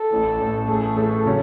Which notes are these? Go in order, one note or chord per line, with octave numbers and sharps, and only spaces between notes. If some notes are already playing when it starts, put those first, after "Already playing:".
Already playing: A4
A1 A2 E3
A1 A2 E3
A2 E3 A3 G#4
A2 E3 A3 A4
C#3 F#3 C#4